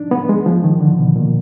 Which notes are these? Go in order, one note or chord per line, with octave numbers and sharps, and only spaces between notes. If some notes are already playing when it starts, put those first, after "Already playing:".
Already playing: D4 D#4
B3
G#3
F3
D#3
D3
B2
A#2